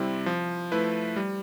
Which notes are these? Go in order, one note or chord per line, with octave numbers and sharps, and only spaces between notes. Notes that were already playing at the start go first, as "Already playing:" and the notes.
Already playing: C3 G3 C4 E4
F3
A3 E4 B4
G3